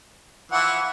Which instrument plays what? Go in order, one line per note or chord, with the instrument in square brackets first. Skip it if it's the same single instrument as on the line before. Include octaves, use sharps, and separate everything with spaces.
[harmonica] E3 F3 E4 [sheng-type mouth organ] F#5